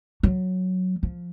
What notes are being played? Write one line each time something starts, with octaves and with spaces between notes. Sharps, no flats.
F#3
F3